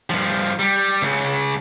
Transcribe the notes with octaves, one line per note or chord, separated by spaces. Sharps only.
G2 F3
G3
C#2 C#3